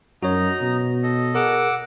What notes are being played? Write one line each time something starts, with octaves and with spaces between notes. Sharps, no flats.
F#2 D#4 F#4 C#5 D#5 A#5
B2
A4 D#5
G#4 A#4 F#5 D6 E6